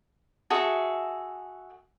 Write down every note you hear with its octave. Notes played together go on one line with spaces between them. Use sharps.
F#4 G#4 A4 E5